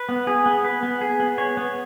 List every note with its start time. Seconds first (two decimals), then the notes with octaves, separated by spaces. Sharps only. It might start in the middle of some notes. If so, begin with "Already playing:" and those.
Already playing: B4
0.09 B3
0.27 G#4
0.46 B3
0.64 B4
0.83 B3
1.01 G#4
1.20 B3
1.38 C#5
1.57 B3